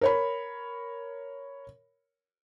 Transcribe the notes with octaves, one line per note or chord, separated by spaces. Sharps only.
A#4 C#5 B5